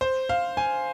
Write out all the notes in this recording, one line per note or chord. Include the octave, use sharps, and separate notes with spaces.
C5
F5
G#5